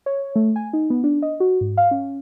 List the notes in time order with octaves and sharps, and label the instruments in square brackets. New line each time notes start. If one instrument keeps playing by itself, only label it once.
[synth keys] C#5
A3
G#5
D#4
B3
D4
D#5
F#4
G#2
F5
C#4